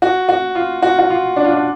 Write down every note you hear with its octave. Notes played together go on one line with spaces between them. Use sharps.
F#4
F#4
F4
F#4
F#4
F4
D4
F4
D4